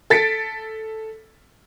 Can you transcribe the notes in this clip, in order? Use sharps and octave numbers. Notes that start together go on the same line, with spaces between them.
A4 A6 B6 C#7 D7